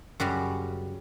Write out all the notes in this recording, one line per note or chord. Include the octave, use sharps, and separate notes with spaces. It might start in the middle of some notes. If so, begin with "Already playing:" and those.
F#2 C#3 G3 F#4